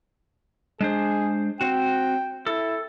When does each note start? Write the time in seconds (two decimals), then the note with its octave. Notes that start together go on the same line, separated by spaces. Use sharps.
0.81 G#3 D4 G#4 C5
1.61 C4 F#4 G5
2.47 E4 A4